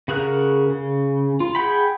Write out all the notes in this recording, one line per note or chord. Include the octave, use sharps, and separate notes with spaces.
C#3 F#4 G#4 A#4 F#6
C#3
F4
G#4 F#5 G5 B5